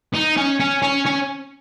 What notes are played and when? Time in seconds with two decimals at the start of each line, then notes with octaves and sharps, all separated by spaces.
0.14 D#4
0.37 C#4
0.60 C#4
0.82 C#4
1.06 C#4